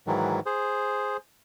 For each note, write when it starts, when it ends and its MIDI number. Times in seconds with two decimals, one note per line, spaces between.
0.07 0.40 44
0.07 0.40 51
0.07 0.40 52
0.07 0.40 54
0.46 1.17 68
0.46 1.17 72